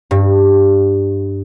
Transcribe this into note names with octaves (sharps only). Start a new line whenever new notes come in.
G2